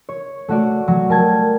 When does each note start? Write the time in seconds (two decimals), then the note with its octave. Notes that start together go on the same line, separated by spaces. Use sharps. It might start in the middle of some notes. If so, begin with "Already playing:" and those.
0.09 C#5
0.48 A3 F#4 D5
0.88 F#3
1.09 G3 A#4 A5 G#6